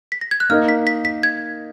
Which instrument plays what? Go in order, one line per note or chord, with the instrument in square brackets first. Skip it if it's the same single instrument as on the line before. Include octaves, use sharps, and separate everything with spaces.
[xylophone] B6
A#6
G#6
F#6
[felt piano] A#3 D#4 A#4 D#5 [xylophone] F6
[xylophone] B6
B6
B6
G#6